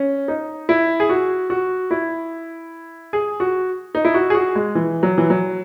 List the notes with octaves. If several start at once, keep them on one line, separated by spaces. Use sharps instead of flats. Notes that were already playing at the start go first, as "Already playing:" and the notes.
Already playing: C#4
D#4
E4
G#4
F#4
F#4
E4
G#4
F#4
D#4
E4
F#4
G#4
F#4
G#3
E3
F#3
E3
F#3